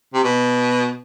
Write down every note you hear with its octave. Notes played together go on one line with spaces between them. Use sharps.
C3
B2